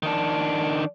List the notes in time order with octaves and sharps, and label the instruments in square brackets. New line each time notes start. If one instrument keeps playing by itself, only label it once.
[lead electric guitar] D#3 D4